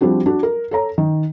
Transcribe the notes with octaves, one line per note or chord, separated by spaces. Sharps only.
F3 G3 C4 D4 F#4
D4 F#4
A#4
A4 C#5 A#5
D#3